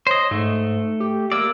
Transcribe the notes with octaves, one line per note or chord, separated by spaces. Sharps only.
C5 C#5 D#5
G#2 A3
G4
A#3 D5 E6